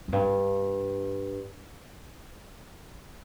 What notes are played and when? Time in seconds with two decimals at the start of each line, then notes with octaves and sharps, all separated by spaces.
0.08 F2
0.12 G2